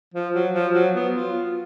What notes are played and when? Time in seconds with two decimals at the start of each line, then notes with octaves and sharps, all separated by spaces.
0.14 F3
0.34 F#3
0.53 F3
0.73 F#3
0.95 B3
1.14 F4